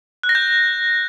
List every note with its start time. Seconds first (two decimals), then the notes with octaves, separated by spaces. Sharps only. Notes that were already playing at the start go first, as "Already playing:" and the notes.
0.23 F#6
0.29 A#6
0.35 G6